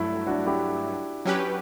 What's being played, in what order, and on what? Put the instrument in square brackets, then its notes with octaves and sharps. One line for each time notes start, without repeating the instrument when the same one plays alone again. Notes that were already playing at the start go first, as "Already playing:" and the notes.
Already playing: [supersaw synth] G2 F#3 A3 [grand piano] E4
[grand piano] D4 F#4
E4 G4
[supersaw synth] F#3 C#4 G4 B4